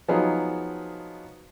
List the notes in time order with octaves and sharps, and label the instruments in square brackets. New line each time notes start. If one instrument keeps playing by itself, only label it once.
[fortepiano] F3 F#3 B3 D#4 G#4 D#5